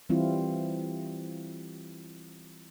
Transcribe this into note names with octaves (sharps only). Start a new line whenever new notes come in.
E3 G3 C4 E4 F4